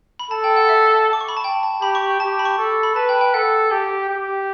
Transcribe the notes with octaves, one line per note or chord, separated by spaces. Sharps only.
B5
A4 A5
G5
F#5
E5
D6
C#6
B5
A5
G5
A5
G4 B5
C#6
G4 A5
B5
C#6
A4
B5
B4 A5
G5
G5
A4 F#5
G4
G4